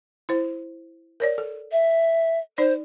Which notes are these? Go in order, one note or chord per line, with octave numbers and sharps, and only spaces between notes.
E4 C5
A#4 C#5 D5
A4
E5
D#4 C5 D5